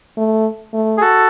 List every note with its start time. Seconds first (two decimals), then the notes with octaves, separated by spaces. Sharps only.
0.17 A3
0.73 A3
0.97 G#4
1.01 F#4 A4